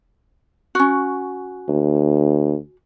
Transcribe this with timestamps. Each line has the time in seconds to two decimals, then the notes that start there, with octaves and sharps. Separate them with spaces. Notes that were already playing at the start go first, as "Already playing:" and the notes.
0.75 C#4 F#4
1.68 D2